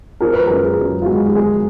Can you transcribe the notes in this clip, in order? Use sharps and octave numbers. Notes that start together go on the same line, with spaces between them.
F3 A#4
B4
F#2 A#4
G#4
F#2
F4
G#3 F#4
F#4
F3 G#4